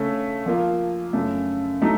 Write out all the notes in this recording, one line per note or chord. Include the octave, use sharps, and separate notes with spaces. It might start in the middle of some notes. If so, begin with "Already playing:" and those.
Already playing: C#3 A3 C#4 A4
F3 A#3 F4
F#2 C#3 A3
F#3 A3 D#4